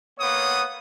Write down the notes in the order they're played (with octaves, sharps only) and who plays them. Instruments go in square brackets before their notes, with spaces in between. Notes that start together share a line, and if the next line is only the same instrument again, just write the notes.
[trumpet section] A#3 B3 C#5 F#5 D#6